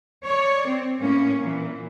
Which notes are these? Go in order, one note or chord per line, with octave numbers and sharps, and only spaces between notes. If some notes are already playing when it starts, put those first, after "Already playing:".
C#5 D5
C4
A2 A#3 C#4
A#2 E3